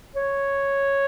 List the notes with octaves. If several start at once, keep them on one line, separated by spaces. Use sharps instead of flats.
C#5